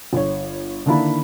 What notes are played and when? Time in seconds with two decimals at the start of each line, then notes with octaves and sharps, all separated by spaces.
0.13 G1 C#5
0.86 D3 D#3 A#3 D4 E4 B5